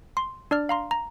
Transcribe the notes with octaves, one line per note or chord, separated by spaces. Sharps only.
C6
D4 D5 F6
F5 A#5 C6
A#5